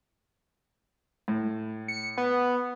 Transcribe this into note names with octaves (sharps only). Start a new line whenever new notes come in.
A2
C#7
B3